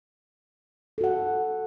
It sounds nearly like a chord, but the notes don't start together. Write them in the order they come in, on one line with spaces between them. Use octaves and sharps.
A4 F#4 F#5